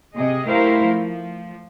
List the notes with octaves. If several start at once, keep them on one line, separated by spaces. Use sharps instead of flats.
C3 G#4 D#5
G3 A3 E4 A#4 C5 F5
F3